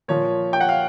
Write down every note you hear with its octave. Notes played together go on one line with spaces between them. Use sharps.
A#2 F3 C#5
G5
F#5
F5